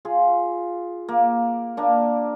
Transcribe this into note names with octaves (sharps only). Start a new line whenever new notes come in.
F4 G#4
A#3
A#3 D4